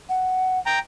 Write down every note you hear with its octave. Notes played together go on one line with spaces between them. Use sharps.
F#5
G5 A#5